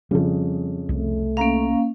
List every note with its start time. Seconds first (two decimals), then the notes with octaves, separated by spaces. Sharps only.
0.11 F2 C#3 F3 G3
0.89 C2 A3
1.37 A#3 C#4 F5 A#5